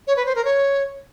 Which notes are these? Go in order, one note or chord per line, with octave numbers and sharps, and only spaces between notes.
C#5
B4
C5
A#4
C#5